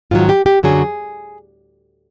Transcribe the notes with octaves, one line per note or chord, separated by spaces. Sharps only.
G#2 D#3 F#3 F4
G4
G4
F#2 D3 F#3 G#4